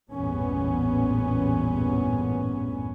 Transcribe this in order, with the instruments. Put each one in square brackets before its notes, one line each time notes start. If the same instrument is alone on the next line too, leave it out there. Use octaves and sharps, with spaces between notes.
[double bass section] A1 E2 G2 A#2 B3 C#4